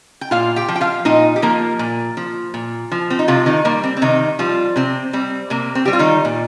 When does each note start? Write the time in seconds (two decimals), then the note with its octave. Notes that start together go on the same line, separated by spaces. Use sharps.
0.21 G5
0.31 A#2 F4 F5
0.56 G4 G5
0.68 F3
0.76 G5
0.81 F4 F5
1.05 A#2 D#4 D#5
1.36 G4
1.42 F3 A#3 A#4
1.79 A#2
2.17 F3
2.54 A#2
2.92 F3
3.10 C4
3.19 D#4
3.28 C3 F3 F4
3.46 D#3 D#4
3.65 G3 A#3
3.83 C4
3.97 C4
4.02 C3 D#3 D#4
4.39 F3 G3 F4
4.76 C3 C4
5.13 G3 C4
5.50 C3 A#3
5.75 C4
5.85 G3 G4
5.93 F4
5.99 D#3 D#4
6.25 A#2